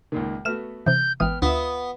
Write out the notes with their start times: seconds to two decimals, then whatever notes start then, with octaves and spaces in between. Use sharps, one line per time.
0.12 C#2 A#2 D#3
0.45 A3 B3 F#4 F6 E7
0.86 C3 E3 G6
1.20 G#1 E3 B3 G5 D#6 F6
1.42 D2 B3 F4 E5 D#6